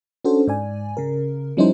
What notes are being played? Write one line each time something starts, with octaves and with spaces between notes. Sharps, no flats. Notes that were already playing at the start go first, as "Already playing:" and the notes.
C#4 D4 F#4 A4 C5
G#2 D5 G#5
C#3 A#4
F3 G3 C#4 D#4 E4 C5